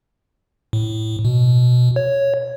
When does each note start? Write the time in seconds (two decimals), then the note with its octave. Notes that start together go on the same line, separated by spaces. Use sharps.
0.73 A2
1.25 B2
1.96 C#5